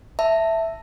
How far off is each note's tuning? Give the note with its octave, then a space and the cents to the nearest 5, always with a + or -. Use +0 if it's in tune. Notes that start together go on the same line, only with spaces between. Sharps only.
E5 +0 A5 +20